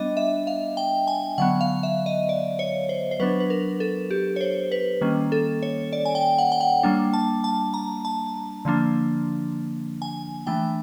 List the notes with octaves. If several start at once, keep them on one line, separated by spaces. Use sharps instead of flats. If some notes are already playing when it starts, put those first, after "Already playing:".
Already playing: G3 B3 D4 D#5
E5
F5
G5
G#5
D3 F#3 B3 F#5
F5
E5
D#5
D5
C#5
C5
C5
F#3 B3 D4 B4
B4
A#4
A4
G4
C#5
C5
B4
D#3 G3 A#3 C#4
A4
C#5
D5
G#5
G5
F#5
G5
F#5
G3 A#3 D4
A5
A5
A#5
A5
D3 F3 A#3 D4
G#5
E3 A3 D4 G5